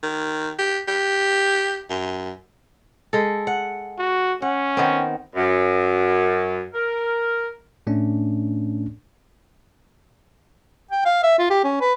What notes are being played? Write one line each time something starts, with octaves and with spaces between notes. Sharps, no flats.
D#3
G4
G4
F#2
G#3 A4
F#5
F#4
C#4 F#5
D#3 B3 C4
F#2
A#4
A2 A3 C#4 D4
G5
F5
E5
F4
G4
C#4
B4